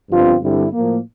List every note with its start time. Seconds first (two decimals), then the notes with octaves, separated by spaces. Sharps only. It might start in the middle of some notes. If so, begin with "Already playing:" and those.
0.09 G1 G2 F3 C4 F4
0.41 G2 D3 G3 C4 E4
0.73 A2 F3 A#3